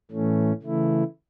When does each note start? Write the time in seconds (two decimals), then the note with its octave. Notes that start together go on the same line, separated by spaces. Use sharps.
0.11 A2 E3 A3 C#4
0.62 C#3 E3 A3 E4